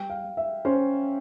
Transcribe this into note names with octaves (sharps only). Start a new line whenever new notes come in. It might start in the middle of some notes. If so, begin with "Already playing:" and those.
Already playing: G3 G5
F5
G3
E5
C#4 C5